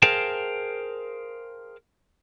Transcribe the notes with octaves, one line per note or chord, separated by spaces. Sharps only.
G#4 A#4 C5 F5 G5 A5